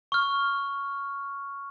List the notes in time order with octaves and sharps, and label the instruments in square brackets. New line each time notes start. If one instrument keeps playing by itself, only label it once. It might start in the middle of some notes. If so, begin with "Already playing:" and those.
[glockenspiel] C#6 F6